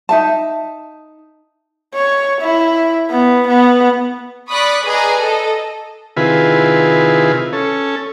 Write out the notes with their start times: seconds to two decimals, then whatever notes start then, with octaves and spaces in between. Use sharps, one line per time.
0.09 D#4 E5 A5
1.94 C#5
2.41 E4
3.10 B3
3.48 B3
4.49 D5 B5 C#6 D#6 F#6 B6
4.86 G#4 B4 D5 D#5 G#5 A#5
5.19 A4 D#5
6.17 C3 D#3 E4 F4 G#4 B4
7.53 C#4 A4